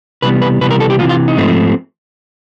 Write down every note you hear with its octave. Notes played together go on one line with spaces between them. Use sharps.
C3 E3 G3 B3 B4
B4
C3 E3 G3 B3 B4
A#4
A4
G4
C3 E3 G3 B3 F4
F4
D#4
G#2 F3 A3 C4